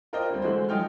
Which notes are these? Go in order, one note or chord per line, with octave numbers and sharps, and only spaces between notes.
F4 A#4 C5 D5 D#5 G5
D2 G3 C4
D3 E3 G#3 A3 F#4 C5
F3 F#3 D#4 G5 F6